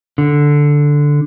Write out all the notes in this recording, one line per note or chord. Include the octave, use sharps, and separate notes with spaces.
D3